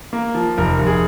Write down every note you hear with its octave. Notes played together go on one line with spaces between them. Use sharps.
A#3
F3
F1 A#4
F1
G#4